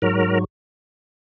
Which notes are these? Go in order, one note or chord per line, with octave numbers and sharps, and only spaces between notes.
G#2 F#3 A#4